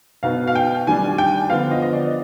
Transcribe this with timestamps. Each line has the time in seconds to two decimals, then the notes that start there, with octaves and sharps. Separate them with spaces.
0.23 B2 B3 D#4 F5
0.47 F5
0.55 G5
0.87 D#3 G3 D4 G#5
1.18 G5
1.50 D3 F3 B3 F5
1.71 D#5
1.82 D#5
1.93 D5